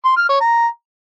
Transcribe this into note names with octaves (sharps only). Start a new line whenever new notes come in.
C6
F6
C#5
A#5